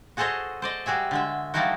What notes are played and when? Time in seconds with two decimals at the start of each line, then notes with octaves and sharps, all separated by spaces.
0.17 F#4 G#4 A4 C5 C#5 D#5
0.62 C5 D5 D#5
0.86 G3 F#4 G#4 E5
1.11 D3 G#3 E5
1.54 F3 G3 A3 D#4 E4 F#4